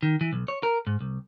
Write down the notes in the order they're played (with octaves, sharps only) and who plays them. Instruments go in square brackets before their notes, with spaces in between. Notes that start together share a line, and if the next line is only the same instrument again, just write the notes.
[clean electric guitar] D#3
E3
B1
C#5
A#4
G#2
C2